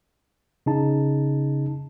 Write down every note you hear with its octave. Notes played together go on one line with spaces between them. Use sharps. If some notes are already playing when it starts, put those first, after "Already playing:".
C#3 D#4 A5